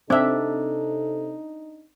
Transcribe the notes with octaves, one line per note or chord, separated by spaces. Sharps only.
C3 C4 D4 D#4 A4 E5